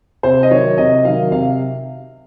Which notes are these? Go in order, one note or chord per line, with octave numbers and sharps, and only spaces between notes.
C3 C5
D#5
D#3 F#3 C#5
C3 D#5
D#3 F#3 F5
C3 F5